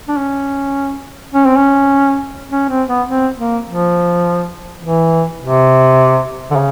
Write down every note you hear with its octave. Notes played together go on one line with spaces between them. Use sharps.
D4
C#4
C#4
C4
C#4
C#4
C4
B3
C4
A#3
F3
E3
C3
D3
C#3